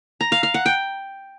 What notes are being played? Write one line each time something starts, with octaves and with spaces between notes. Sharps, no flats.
A#5
F5
F5
F#5
G5